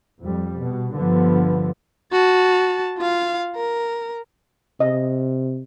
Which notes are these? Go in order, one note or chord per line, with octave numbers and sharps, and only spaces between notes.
F2 G3
B2
G2 D3 F3 B3
F#4 A5
F4 F5
A#4
C3 D#5